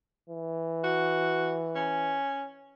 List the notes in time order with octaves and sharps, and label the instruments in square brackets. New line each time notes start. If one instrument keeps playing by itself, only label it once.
[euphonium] E3
[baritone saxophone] F#4
C#4